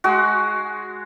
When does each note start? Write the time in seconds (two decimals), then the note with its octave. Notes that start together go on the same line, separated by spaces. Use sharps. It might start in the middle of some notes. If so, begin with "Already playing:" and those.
0.04 G#3 F#4